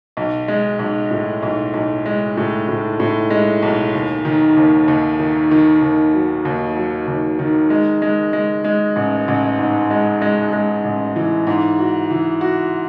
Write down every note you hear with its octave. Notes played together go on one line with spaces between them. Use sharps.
B1
G#3
B1
A2
B1
B1
G#3
A2
A2
A2
G#3
B1
D#2
D#3
D#2
D#2
D#3
D#3
D#2
F#3
D#2
F#3
D#2
D#3
G#3
G#3
G#3
G#3
A1
A1
G#2
G#3
G#3
G#3
A1
E3
G#2
F#4
E3
F#4